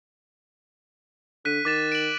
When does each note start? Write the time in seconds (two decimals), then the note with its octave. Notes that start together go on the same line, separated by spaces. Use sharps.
1.45 D3 F#6 B6 D#7
1.65 D#3 D6 A6 E7
1.92 D7 F#7